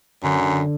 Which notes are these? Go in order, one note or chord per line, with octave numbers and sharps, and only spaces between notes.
F#2 D3